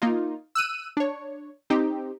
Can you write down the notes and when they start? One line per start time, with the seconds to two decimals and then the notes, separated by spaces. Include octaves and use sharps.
0.02 A#3 D#4 F4
0.55 E6 F#6 D#7
0.97 D4 C#5
1.70 C4 D#4 G4